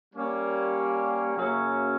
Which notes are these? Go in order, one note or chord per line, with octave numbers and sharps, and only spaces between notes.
G3 A#3 C#4
F#2 C#3 F#3 A#3 C#4